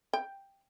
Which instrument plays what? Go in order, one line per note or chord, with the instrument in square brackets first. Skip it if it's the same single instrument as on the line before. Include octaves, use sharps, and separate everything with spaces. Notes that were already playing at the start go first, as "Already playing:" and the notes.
[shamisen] G5